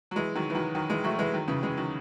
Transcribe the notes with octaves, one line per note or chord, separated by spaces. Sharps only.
F#3
E3 G#3
D#3 F#3
E3
D#3 F#3
D#3 F#3
E3 G#3
F#3 A3
E3 G#3
D#3 F#3
C#3 E3
E3 G#3
D#3 F#3